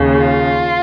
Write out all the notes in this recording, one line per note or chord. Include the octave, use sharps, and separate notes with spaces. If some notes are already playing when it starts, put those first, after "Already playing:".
Already playing: D#2 C#3
F4